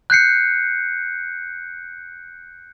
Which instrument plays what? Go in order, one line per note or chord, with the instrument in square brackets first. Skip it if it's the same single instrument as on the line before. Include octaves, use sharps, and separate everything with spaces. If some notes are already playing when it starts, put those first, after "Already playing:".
[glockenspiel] F#6 G6 C7 C#7